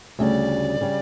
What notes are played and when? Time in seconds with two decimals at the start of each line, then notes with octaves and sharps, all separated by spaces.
0.19 D2 C#3 G3 D5 E5
0.81 C#3 G3